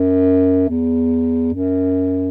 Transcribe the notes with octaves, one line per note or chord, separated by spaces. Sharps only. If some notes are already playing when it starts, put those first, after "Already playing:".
Already playing: F#2
E2
F#2